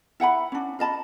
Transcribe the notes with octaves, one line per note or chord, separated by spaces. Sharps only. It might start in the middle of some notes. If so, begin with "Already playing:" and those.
E4 F#5 G5 B5
C#4 D4
F4 D#5 A5 B5